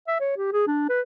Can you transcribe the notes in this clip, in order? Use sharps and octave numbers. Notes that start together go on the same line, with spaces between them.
E5
C#5
G4
G#4
D4
B4